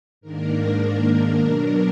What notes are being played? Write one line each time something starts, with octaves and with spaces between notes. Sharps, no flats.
G#2 D#3 A#3 D4 A#4
B2 F#3 D4